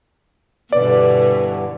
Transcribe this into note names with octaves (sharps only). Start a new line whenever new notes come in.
G2 B2 D3 E3 B4 D5